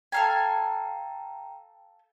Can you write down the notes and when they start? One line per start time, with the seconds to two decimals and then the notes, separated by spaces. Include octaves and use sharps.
0.12 A4 F5 G5 G#5 A#5